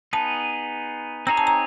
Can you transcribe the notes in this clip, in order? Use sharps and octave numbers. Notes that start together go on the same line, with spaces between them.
B3 D#4 G#4 B4 A5
C4 D#4 G#4 C#5 A#5
A5
A#5